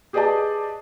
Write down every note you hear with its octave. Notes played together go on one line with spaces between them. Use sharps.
G4 G#4 B4 D5 D#5 A5